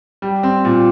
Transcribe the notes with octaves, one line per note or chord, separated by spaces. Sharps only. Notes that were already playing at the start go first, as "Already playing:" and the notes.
G3
C4
A#2